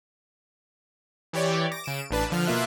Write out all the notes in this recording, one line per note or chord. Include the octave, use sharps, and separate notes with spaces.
E3 G4 C#5 D5
D6 A#6
C#3 D7 E7
A1 D4 B4 A5
D3 F3 F6
B2 A#3 F4 E5 F#6